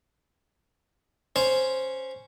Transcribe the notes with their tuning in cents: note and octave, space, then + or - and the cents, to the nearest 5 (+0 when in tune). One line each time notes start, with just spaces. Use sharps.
C#4 +0 C5 +0